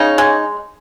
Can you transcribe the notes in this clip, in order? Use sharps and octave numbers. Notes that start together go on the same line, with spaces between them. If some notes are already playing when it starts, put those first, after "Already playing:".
Already playing: C#3 C#4 D#4
G#3